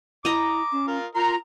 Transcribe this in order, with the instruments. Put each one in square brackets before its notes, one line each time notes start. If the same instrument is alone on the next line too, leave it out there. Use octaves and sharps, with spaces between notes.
[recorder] E4 [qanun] D#5 A#5 [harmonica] D6
[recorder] C#4
[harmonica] F4 A#4
[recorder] F4 [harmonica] A#4 C6 [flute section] A#5